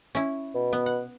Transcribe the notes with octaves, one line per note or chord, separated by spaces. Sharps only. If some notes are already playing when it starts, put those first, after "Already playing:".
C#4 E4
B2
B3
F#5